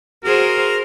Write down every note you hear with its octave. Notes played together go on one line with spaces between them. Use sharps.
F#4 G#4 A#4 C5